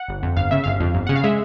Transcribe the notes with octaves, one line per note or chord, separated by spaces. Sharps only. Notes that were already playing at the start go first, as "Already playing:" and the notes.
Already playing: F#5
G1
F2
G1 F5
C#3 E5
G1 F5
F2
G1
C#3 F#5
F5
G#3 E5